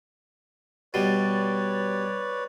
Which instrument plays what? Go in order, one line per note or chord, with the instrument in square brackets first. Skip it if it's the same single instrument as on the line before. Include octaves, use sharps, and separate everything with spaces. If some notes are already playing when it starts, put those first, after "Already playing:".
[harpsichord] B2 G3 [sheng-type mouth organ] B4 C#5 D5